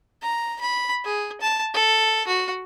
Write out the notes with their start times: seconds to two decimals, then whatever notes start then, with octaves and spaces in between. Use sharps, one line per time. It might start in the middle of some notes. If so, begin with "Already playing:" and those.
0.22 A#5
0.60 B5
1.04 G#4
1.41 A5
1.74 A4
2.27 F#4